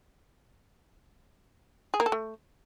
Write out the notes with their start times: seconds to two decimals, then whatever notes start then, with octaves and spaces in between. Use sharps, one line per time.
1.94 G#4
2.00 A#3
2.06 A4
2.12 A3